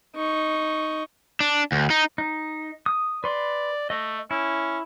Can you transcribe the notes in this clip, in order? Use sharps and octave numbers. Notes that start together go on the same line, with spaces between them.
D#4 C#6
D4
D2
D#4
D#4
D#6
B4 D5 C6
A3 D#5
C#4 E4